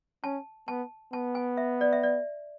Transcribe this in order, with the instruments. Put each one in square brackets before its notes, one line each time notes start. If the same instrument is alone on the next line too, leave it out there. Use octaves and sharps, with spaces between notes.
[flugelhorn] C#4 [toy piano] A5
[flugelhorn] B3 [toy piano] A5
[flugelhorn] B3 [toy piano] A5
[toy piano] G#5
E5
D5
E5
D5